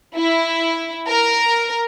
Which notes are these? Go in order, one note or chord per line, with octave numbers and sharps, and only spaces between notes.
E4
A#4